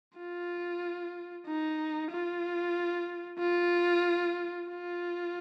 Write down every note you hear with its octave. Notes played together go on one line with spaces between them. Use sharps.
F4
D#4
F4
F4
F4